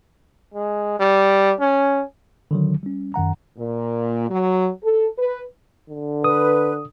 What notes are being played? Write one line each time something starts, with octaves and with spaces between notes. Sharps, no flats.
G#3
G3
C#4
D3 D#3 F#3
G3 C#4
F#2 D#3 F#5 A#5
A#2
F#3
A4
B4
D3
B4 D#6